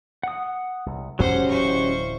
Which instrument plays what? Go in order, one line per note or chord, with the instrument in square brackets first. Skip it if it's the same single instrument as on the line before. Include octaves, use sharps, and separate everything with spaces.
[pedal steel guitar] F#5 D#6
[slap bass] C2
[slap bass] F1 F2 A3 [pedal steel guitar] F#3 C#4 G4 [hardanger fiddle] C5 F#5
[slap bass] D1 E3 [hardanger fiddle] C5 C#6